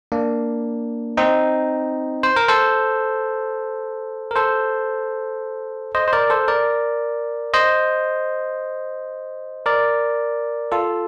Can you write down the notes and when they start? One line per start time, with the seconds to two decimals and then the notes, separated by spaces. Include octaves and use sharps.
0.12 A#3 D4
1.17 C4 D#4
2.23 C5
2.36 A#4
2.48 A4 C5
4.31 A#4
4.36 A4 C5
5.95 C5 D#5
6.08 C5
6.13 A#4 D5
6.30 A4 C5
6.48 A#4 D5
7.54 C5 D#5
9.66 A#4 D5
10.72 F4 A4